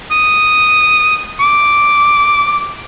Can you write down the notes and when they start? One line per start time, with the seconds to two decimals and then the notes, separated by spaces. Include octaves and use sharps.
0.11 D#6
1.40 D6